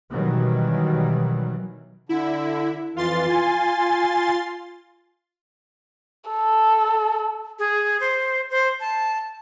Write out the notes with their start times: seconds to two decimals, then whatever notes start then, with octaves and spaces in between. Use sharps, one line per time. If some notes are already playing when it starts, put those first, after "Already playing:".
0.11 B2 D#3 E3 F#3 G3
2.09 D3 E4
2.96 F2 E3 F4 C6 A6
3.29 G#5
6.30 A4
7.59 G#4
8.00 C5
8.51 C5
8.80 A5